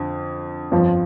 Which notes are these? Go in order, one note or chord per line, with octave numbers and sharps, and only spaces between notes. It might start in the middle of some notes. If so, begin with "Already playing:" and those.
Already playing: F2 D3
G1 F2 F3